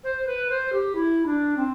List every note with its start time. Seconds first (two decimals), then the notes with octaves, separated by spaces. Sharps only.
0.03 C5
0.26 B4
0.49 C5
0.72 G4
0.95 E4
1.25 D4
1.56 C4